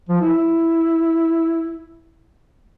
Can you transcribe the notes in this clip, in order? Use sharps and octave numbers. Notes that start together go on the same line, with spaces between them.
F3
E4